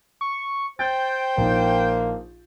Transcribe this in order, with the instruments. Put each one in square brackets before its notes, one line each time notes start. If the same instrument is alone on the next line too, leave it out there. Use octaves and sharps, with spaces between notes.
[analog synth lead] C#6
[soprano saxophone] C5 [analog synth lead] G5 [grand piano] G6 A6
[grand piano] A#1 D#4 [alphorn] A#3